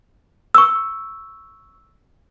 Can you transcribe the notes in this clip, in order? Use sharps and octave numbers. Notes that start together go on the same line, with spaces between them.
C#6 E6